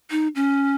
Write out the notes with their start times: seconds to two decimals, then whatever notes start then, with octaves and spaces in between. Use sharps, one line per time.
0.11 D#4
0.36 C#4